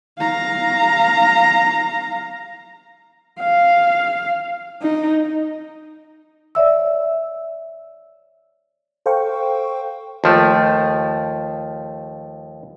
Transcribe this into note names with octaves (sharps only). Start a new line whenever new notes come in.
F5 A#5
F5
D#4
C#5 D5 E5 E6
A4 C5 F5 G5 C#6
D#2 F3 A3